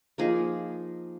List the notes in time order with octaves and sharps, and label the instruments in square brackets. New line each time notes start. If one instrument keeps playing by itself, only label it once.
[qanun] F3 A#3 D#4 G#4